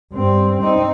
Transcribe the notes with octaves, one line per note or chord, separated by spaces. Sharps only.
G2 C4
C4 D#4